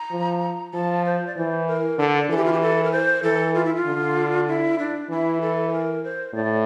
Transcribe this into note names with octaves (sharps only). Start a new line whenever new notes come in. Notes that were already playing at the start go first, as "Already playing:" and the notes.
Already playing: A#5
F3
F3 A5
C5
D5
E3 C5
A#4
D3 A4
E3 A4
G4
F4
G4
A4
A#4
C5
E3 A4
F4
E4
F4
D3
E4
D4
E3 E4
A4
C5
A#4
C5
A2 D5